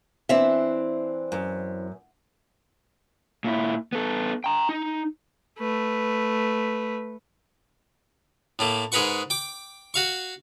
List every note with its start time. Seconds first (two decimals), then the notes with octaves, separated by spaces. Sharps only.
0.29 E3 C4 D4 E5
1.32 F#2
3.44 A#2 E4
3.93 B3 A4
4.44 G5 A#5
4.69 D#4
5.59 A3 B4
8.59 A2 A3 A#3
8.92 G#2 G#4 A#4 B4 F#5 C#6
9.30 G5 D6
9.94 F#4 F5 C#6